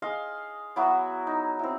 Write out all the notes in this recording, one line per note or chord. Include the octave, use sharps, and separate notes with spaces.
G#4 D#5 F5 C6
F#3 B3 E4 F#4
D#4
C4 E4